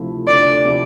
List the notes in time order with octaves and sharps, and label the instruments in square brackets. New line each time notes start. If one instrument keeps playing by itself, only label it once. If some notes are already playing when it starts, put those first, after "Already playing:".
Already playing: [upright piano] D2 C3 F3 A3 E4
[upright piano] D2 [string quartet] D5
[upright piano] C3 F3 A3 E4